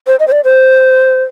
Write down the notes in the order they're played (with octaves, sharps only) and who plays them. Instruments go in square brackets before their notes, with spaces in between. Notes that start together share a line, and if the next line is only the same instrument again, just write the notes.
[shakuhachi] C5
D#5
C5
D5
C5